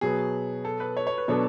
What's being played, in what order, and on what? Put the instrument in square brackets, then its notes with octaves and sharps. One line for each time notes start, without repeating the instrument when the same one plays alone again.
[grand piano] B2 F#3 B3 [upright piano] G#4
[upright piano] A4
B4
C#5
C#5
B4
[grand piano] B2 F#3 B3 D4 A4 [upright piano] C#5